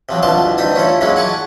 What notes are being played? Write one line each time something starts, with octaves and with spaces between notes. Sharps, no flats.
C3 F3 F#3
C2 B2 D3 F4 A5 C6
D2 G2 D#4 E5 D#6
C#4 E4 F4 A4
C#3 F#3 G#3 A#3 C#4 E4
D5 F#5 G#5 A5 C#6